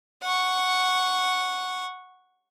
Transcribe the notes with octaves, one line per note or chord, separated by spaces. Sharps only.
F#5 C#6